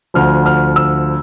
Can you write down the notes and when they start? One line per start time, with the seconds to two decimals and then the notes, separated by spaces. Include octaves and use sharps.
0.14 D2 D3 F3 F6
0.46 F6
0.76 E6